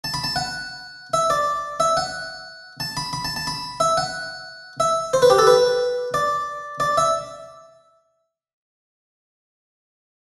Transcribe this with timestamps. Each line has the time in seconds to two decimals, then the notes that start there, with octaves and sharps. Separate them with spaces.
0.04 A5
0.14 B5
0.24 A5
0.36 F#5
1.13 E5
1.30 D5
1.80 E5
1.97 F#5
2.80 A5
2.97 B5
3.13 B5
3.25 A5
3.36 A5
3.47 B5
3.80 E5
3.97 F#5
4.80 E5
5.13 C5
5.22 B4
5.30 G4
5.38 A4
5.47 B4
6.14 D5
6.80 D5
6.97 E5